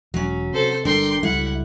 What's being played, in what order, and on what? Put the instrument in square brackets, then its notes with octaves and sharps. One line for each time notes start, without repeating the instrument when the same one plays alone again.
[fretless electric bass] E1 [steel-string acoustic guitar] F#3 C#4
[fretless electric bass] C3 [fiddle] A4 C5
[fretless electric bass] G1 G2 [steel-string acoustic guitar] D4 A4 A#4 [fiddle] G5 C6
[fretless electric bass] C#2 F#3 G3 [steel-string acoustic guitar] E4 [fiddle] F#5